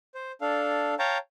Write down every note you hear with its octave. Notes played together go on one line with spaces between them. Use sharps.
C5
D4 A4 F5
C#5 F5 G5 A5 A#5